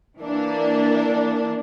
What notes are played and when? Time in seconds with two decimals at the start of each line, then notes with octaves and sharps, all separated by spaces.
0.19 E3 A#3 D4